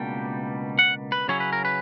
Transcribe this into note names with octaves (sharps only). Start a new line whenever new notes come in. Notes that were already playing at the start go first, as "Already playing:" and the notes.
Already playing: C#2 B2 G3 A#3 D4 G5
F#5
B4
C#3 F#3 C#4 E4 C#5
B4
A#4
B4